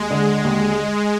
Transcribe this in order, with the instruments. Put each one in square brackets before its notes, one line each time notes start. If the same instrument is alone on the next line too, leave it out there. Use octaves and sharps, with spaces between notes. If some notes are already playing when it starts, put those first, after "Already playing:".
Already playing: [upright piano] D#2 [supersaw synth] G#3
[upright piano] D3
D#2